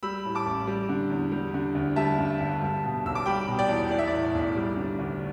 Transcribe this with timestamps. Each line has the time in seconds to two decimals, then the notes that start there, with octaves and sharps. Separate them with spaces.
0.03 G3 B5 E6
0.25 A2
0.35 A5 D6
0.46 A1
0.67 G3
0.89 D3
1.10 E2
1.32 G3
1.54 D3
1.75 D2
1.96 G3 E5 A5
2.18 G2
2.40 G1
2.62 G3
2.84 B2
3.05 B1 E6
3.15 D6
3.26 G3 G5 B5
3.47 B2
3.59 D5 G5
3.69 E2
3.90 E3 D5
3.98 E5
4.07 A2 D5
4.35 B1
4.56 G3
4.77 D3
4.99 D2